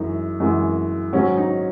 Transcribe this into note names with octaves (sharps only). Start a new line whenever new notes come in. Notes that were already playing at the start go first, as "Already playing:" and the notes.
Already playing: F#2 E3 G#3 D#4
F#2 E3 G#3
G#2 D#3 F#3 C#4
D#4